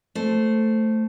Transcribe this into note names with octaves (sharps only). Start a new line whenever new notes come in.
A3 C5